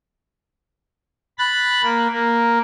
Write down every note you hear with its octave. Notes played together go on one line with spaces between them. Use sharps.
B5 F#6 A6
A#3
A#3